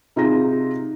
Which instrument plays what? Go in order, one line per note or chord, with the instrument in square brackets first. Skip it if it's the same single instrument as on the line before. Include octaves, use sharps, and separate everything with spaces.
[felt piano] C3 D#4 F4 G#4 A#6